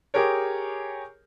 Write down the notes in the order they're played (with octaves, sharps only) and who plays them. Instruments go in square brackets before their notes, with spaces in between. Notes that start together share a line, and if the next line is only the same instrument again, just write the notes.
[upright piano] G4 G#4 A#4 C#5